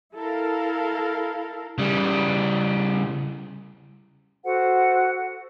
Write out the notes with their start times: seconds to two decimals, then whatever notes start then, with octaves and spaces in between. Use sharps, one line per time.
0.16 E4 A4 A#4 F5
1.78 C#3 G3
4.44 F#4 A4 C5 F#5